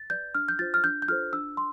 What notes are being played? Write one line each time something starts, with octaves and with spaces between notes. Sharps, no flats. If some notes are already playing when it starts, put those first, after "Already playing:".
Already playing: A6
B4 D5 G6
D4 F6
G6
F4 C5 A6
F6
D4 G6
G6
F4 A4 C5 F6
D4 E6
C6